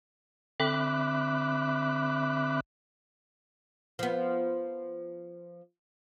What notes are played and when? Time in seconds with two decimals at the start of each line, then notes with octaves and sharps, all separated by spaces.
0.60 D3 C4 E5 B5 D6 F#6
3.99 F3 B3